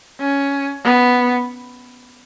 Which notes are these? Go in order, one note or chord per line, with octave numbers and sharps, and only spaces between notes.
C#4
B3